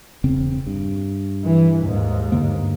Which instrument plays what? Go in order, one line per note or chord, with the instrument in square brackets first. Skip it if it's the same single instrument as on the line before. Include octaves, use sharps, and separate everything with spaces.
[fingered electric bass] E1 C#3 C4
G2
[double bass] E3
D#2 G#2
[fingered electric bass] G2 D3 A#3